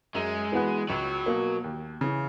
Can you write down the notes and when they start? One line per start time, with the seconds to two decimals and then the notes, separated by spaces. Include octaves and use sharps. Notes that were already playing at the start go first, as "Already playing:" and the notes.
0.15 F#2 G#3
0.52 E3 B3 F#4 B4
0.89 C#2 F#3
1.26 B2 A#3
1.64 D#2
2.01 C#3 E3